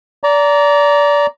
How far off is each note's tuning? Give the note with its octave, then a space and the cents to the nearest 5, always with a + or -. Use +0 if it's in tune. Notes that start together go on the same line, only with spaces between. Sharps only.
D5 -25 A#5 +0